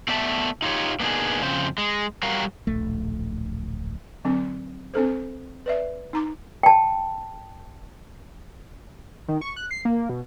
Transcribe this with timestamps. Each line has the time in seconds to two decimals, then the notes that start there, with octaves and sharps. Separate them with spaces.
0.08 A3 B3 D5 E5 A5
0.62 D#4 F4 G4 C#5
1.00 A#3 B3 D4 D#4 G#4
1.42 F2 C#3 C5
1.78 G#3
2.23 F#3 G3 F#4 A#4 F5
2.67 D1 A#1 A3
4.25 D3 F#3 C4 D4
4.94 C4 D4 A4 C5
5.66 B4 D5 E5
6.13 D#4 A#5 D6
6.63 G5 A5
9.28 D#3
9.41 C#6
9.56 F#6
9.71 C7
9.85 A#3
10.09 B2